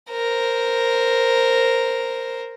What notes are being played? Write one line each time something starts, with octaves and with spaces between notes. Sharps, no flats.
A#4 C5